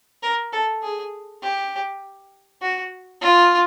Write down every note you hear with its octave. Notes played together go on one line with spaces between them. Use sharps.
A#4
A4
G#4
G4
F#4
F4